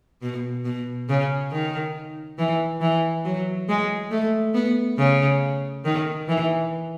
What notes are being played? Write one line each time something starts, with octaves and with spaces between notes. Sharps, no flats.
B2
B2
C#3
D#3
E3
E3
F#3
G#3
A3
B3
C#3
D#3
E3